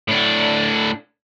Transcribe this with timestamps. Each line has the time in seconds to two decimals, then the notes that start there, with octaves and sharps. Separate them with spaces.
0.08 A2 D4